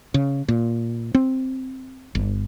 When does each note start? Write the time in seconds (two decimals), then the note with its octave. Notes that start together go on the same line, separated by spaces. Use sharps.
0.14 C#3
0.48 A#2
1.15 C4
2.15 G1